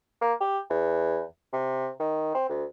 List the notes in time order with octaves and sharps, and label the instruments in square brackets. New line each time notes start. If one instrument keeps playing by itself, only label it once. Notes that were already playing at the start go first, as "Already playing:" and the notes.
[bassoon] A#3
G4
E2
C3
D#3
C4
D2